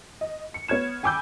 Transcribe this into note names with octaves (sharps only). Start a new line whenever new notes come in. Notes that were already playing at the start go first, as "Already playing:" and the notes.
D#5
C#7
B3 C#5 F6 G#6 E7
G5 G#5 B5 D6 E6 G6